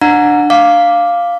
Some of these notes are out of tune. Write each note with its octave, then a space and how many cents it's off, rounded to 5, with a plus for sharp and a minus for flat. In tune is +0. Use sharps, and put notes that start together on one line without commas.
D4 +20 F#5 -25 A#5 -5
F5 +0 D6 +0